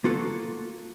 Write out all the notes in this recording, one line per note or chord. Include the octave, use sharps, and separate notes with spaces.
A#3 F4 F#4 A4